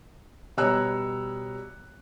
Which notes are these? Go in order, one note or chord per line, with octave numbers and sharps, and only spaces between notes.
B2 G3 C#5 A#5 E6 F#6